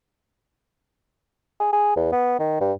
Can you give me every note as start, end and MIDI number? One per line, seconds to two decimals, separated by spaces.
1.60 1.69 68
1.73 1.93 68
1.96 2.10 40
2.12 2.37 59
2.39 2.58 51
2.60 2.72 43